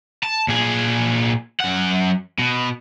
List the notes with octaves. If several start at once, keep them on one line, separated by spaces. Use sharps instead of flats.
A5
A#2 G#4
F#2 F#5
B2